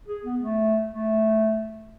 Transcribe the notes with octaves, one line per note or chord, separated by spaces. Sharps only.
G#4
B3
A3
A3